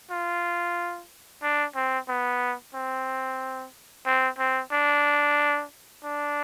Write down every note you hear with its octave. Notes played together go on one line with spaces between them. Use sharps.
F4
D4
C4
B3
C4
C4
C4
D4
D4